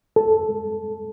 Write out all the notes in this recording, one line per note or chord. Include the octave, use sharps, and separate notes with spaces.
A4